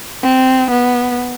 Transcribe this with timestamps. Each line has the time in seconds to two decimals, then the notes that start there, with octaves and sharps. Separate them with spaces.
0.23 C4
0.71 B3